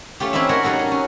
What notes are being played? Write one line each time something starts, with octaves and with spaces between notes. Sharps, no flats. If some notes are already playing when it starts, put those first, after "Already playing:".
A3 C#4 F4 G4
C4 C#4 D#4 E4 E5
F#4 A#4 C#5 D#5 E5 F#5
F#3 G3 D#4 F#4 A4
C#4
C#4